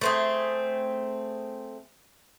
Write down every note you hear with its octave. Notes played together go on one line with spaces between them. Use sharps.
A3 C4 G#4